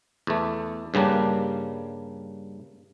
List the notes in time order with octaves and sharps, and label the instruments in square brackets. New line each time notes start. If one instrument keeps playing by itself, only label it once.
[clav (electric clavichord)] E2 A3
G2 C#3 G3 A#3 D4